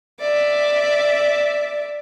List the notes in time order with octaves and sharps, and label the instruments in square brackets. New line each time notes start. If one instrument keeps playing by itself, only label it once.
[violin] D5 E5